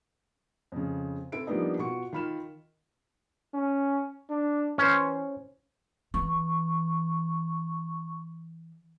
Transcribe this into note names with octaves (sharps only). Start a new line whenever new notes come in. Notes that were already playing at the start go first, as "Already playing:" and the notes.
F2 C#3
C4 E4 A4 E5 D7
F3 G3 A#3 B3 D4 D#4
B2 F4 F#4 C#6 C#7
D#3 F4 B5 F6 E7
C#4
D4
E3 C#4 C5
E3 C#6